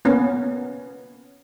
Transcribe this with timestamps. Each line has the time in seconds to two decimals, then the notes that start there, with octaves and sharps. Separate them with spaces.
0.05 A#3 B3 C#4